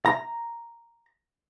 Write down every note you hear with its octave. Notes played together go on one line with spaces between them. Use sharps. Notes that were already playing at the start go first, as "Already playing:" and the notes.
A#5